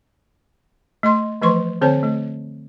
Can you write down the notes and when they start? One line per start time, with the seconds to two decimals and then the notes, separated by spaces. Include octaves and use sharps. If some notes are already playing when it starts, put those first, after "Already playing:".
1.03 A3 D#5 C6
1.42 E3 F3 A3 B4 C6 C#6
1.81 D3 C4 C5 C#5 A5
2.03 A3